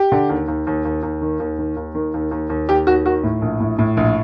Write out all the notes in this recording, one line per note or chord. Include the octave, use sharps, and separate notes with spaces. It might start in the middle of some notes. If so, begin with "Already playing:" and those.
Already playing: G4
D3
D#2
D#2
D#2
D#2
D#2
D#3
D#2
D#3
D#2
D#3
D#2
D#2
D#2
D#2 G4
D#2 F#4
D#3 F#4
A2
A#1
A2
A2
A#1